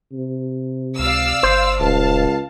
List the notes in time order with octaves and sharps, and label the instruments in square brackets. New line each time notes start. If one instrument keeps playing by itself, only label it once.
[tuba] C3
[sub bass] C#2 [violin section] D5 F5 E6
[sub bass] G1 [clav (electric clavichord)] C5
[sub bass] D#1 [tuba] C#2 [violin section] F5 A5